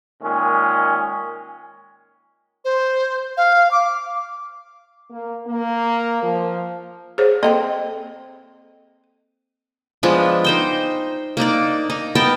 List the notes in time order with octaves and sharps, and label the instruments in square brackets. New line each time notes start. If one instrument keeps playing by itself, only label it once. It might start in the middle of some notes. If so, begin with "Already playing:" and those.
[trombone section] A#2 D#3 G#3 C#4
[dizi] C5
F5
D6
[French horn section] A#3
A#3
F3
[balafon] G#4 C5 C#5
[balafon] A#3 [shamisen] C4 A4 D#5
[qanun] F3 G#3 B3 D4
D#4 C5 G5
A#3 D4 D#4 D5
D#4
B3 A#4 G5 A5